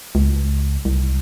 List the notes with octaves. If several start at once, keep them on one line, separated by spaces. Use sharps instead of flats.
C#2
C2